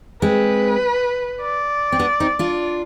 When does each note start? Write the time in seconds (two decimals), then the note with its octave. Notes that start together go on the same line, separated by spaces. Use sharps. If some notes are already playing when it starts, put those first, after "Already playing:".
0.22 G#3 C4 B4
1.40 D5
1.92 C4
1.99 B3 D4
2.20 C4 D#4
2.39 D4 F4